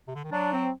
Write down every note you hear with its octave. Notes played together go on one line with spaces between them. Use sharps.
C3
D3
D#3
F#3 D4
C4